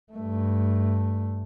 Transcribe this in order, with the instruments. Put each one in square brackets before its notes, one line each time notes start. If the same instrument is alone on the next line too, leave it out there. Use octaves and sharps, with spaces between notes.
[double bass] G2 A3